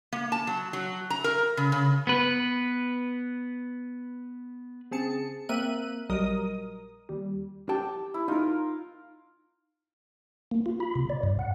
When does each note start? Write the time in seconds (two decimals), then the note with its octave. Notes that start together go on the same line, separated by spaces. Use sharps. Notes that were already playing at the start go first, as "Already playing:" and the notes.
0.13 A#3
0.32 A5
0.47 F#3
0.73 F#3
1.10 A#5
1.24 A#4
1.57 C#3
1.72 C#3
2.07 B3 B4
4.91 C#3 C4 G#4 A5 C#7
5.49 A#3 C4 A#4 E5 F#6 D#7
6.10 A#1 F#3 G3 A#4 D#5 D#6
7.09 D#2 G3
7.69 G4 G5 A5
8.14 E4
8.28 D#4 F4 A#4
10.51 A#3
10.66 F4
10.80 B5
10.95 C3
11.10 D5
11.23 G2
11.39 F#5